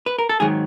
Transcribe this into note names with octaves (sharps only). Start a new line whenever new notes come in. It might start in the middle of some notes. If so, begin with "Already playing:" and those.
B4
A#4
A4
G#2 D#3 F#3 G#4